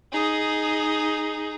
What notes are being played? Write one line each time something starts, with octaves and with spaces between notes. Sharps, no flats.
D#4 G#4